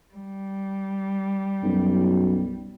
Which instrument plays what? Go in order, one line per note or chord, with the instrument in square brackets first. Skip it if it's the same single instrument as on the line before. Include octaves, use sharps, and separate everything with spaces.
[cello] G3
[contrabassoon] B1 [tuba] F#2